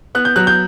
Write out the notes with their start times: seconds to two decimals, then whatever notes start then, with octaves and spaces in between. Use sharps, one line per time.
0.15 B3 F#6
0.25 G6
0.36 F#3 F#6
0.47 G6